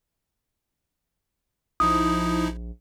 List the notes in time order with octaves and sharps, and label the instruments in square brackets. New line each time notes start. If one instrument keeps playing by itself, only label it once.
[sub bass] A#1 [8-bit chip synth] F3 D#4 E4 [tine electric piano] D#6